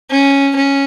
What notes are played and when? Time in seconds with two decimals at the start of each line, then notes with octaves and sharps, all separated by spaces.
0.11 C#4
0.56 C#4